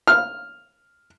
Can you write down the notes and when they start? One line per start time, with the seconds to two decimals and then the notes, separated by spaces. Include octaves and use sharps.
0.07 F6